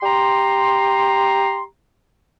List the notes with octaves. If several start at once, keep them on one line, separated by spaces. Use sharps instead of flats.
G4 A#5 C6